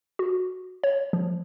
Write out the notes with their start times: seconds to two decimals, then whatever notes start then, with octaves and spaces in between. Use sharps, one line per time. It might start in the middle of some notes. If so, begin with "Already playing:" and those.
0.19 F#4
0.84 C#5
1.13 F3